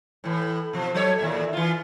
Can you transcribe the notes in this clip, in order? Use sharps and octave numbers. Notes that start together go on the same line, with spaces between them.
A2 E3
B2 F3
F#3 A4 C#5
D#2 A#2 E5
E3 F4